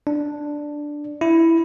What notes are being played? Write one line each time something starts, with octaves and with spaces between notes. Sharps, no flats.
D4
E4